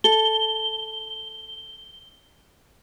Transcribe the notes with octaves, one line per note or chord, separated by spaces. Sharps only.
A4 G7